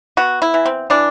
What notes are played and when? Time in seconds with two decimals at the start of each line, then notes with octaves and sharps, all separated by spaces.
0.17 B3 F#4
0.42 E4
0.54 E3
0.66 C4
0.90 E3 D4